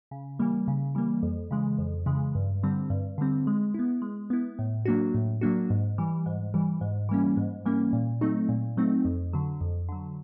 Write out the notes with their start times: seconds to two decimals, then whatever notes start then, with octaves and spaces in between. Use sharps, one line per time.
0.11 C#3
0.39 E3 G3 A#3
0.68 C#3
0.95 E3 G3 A#3
1.23 F2
1.51 C#3 E3 G#3
1.78 F2
2.06 C#3 E3 G#3
2.35 G2
2.63 D3 G3 C4
2.90 G2
3.18 D3 G3 C4
3.47 G#3
3.74 B3 E4
4.02 G#3
4.30 B3 E4
4.59 A2
4.85 F#3 A#3 D4 F#4
5.14 A2
5.41 F#3 A#3 D4 F#4
5.70 G#2
5.98 E3 G3
6.26 G#2
6.54 E3 G3
6.81 G#2
7.09 E3 G3 A#3 C#4
7.37 G#2
7.66 E3 G3 A#3 C#4
7.93 A#2
8.21 F#3 A3 C4 D#4
8.49 A#2
8.77 F#3 A3 C4 D#4
9.05 F2
9.33 D3 F#3
9.61 F2
9.89 D3 F#3